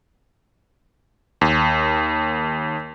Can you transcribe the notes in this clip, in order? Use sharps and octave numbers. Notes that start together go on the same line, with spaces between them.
D#2